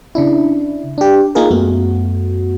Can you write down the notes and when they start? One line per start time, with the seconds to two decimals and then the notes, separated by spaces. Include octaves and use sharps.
0.15 C#3 D4 E4
0.98 D4 G4
1.35 A#3 D#4 F4 G#4 A#4
1.51 F#2 A3 B3 F#4